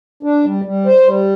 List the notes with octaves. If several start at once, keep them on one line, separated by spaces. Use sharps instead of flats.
D4
G3
G3
C5
G3